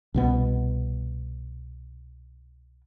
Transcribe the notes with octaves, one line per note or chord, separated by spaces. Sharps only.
C2 B2 B3